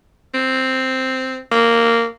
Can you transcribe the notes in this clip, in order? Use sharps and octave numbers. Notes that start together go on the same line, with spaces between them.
C4
A#3